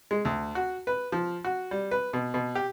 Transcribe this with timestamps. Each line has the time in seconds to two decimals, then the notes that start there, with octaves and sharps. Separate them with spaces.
0.11 G#3
0.25 D2
0.55 F#4
0.87 B4
1.12 F3
1.45 F#4
1.71 G3
1.91 B4
2.13 B2
2.34 B2
2.55 G4